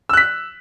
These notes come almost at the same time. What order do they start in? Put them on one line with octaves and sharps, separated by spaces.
E6 F#6 B6